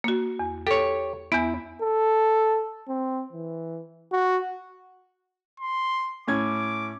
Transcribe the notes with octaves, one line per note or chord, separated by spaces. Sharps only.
A#3 F#4
E2
G4 A4 C#5
E2 B3 E4
A4
C4
E3
F#4
C6
A2 C#4 D6 G#6